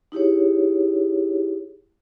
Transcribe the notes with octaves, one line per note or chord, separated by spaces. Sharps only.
D#4 E4 G4 G#4 C#5